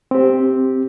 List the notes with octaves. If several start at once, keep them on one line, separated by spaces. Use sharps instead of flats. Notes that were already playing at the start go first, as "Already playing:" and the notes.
C4 G4